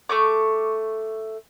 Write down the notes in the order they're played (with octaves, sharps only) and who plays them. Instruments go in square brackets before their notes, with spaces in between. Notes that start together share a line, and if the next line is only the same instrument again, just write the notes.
[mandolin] A3 C#6 D6